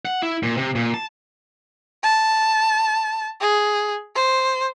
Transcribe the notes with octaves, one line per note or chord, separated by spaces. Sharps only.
F#5
E4
A#2
C3
A#2
A5
A5
G#4
C5